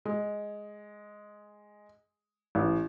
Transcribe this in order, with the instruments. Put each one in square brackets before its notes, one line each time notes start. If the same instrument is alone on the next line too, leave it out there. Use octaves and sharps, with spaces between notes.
[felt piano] G#3
A1